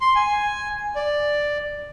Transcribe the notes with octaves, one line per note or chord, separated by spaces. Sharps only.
C6
G#5
D5